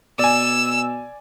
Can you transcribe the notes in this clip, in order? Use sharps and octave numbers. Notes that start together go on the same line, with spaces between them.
B2 D5 G#5 E6